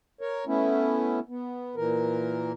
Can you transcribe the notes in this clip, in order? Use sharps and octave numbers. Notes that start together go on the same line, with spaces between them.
A#4 C#5
A3 B3 C#4 E4
B3
A#2 E3 A#4